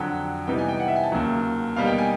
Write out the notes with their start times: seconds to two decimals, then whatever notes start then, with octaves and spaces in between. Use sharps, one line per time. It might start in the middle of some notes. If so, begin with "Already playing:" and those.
Already playing: F2 D3 F#3 G5
0.47 C3 E3 G3 B3 D#4 G5
0.58 G#5
0.69 G5
0.80 F#5
0.88 E5
0.96 G#5
1.04 A5
1.12 D#2 C#3 F#3
1.76 B2 G3 A#3 D#4 F5
1.87 G5
1.98 G#5